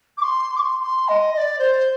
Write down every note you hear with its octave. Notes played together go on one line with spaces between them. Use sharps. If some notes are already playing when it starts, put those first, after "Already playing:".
D6
C6
D6
C6
C6
D#5
D#5
D5
C5